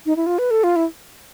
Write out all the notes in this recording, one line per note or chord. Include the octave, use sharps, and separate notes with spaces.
D#4
E4
F4
B4
A4
F4
E4